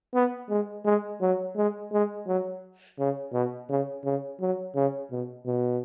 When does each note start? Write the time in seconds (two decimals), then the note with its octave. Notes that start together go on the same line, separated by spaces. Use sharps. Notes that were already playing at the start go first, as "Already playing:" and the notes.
0.14 B3
0.50 G#3
0.85 G#3
1.21 F#3
1.56 G#3
1.92 G#3
2.27 F#3
2.99 C#3
3.33 B2
3.69 C#3
4.05 C#3
4.41 F#3
4.75 C#3
5.12 B2
5.46 B2